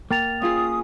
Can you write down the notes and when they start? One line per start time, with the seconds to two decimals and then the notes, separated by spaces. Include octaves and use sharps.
0.11 A#3 A#4 G5 A6 F7
0.42 C#4 F4 G#4 D#6